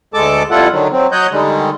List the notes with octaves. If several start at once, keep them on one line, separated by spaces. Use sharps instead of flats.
D2 G#3 A4 A5 D6
F2 G3 E4 F4 A4 F#5
D3 D#3 F#3
F#3 C4
F#3 C#5 D#5 F#5 G6
D3 D#3 G3 G#3